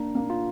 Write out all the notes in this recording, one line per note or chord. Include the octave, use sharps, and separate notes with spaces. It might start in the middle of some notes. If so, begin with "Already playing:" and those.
Already playing: A#3 D4
A#3
F4